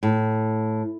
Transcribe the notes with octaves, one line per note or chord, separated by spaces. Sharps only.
A2